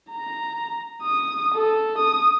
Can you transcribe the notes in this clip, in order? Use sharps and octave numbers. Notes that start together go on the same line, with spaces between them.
A#5
D#6
A4
D#6